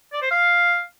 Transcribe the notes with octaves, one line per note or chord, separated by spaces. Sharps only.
D5
C5
F5